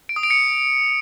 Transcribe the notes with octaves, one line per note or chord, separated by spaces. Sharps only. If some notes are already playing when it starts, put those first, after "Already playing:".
D7
D#6
D7
C#7